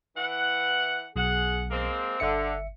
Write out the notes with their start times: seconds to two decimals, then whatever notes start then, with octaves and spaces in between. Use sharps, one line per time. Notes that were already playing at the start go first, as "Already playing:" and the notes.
0.16 E3 F#5
1.16 B1 G#4 F#5
1.71 G#3 A#3 C4
2.20 G1 D3 E5 C#7